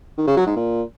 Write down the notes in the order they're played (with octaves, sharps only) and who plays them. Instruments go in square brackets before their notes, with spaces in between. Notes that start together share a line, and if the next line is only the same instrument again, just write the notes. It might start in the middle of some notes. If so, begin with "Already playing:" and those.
[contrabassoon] D#3
C#3
F#3
G#2
A#2